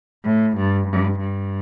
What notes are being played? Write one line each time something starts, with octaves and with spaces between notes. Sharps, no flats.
A2
G2
G2
G2